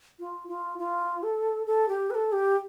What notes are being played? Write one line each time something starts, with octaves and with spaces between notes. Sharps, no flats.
F4
F4
F4
A4
A4
G4
B4
A4
G4